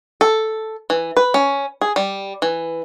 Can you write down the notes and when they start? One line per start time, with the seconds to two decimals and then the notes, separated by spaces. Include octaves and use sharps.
0.21 A4
0.90 E3
1.17 B4
1.34 C#4
1.81 G#4
1.96 G3
2.42 E3